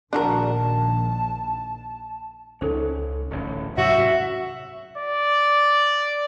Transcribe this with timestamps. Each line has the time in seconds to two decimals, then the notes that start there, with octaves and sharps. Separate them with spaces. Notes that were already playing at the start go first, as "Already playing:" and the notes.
0.13 A#1 D#3 D4 F#4 A#4 A5
2.61 C#2 C#4 D#4 A4 C5
3.30 D1 A1 C#4
3.77 G#2 C3 F#3 F#4 C#5 E5 C#6
4.98 D5